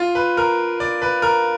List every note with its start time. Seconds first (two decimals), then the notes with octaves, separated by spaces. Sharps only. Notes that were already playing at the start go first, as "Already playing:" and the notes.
Already playing: F4
0.15 B4
0.37 A#4
0.80 D5
1.02 B4
1.22 A#4